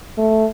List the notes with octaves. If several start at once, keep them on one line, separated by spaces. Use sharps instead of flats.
A3